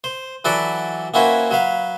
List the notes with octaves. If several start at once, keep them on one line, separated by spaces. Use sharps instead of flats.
C5
E3 F#3 F#4 A4 B4 D5
A#3 C#4 E4 F#4 B4 C5
F#3 B4 F5